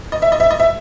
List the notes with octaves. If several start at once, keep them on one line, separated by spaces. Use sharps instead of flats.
D#5
E5
D#5
E5
D#5
E5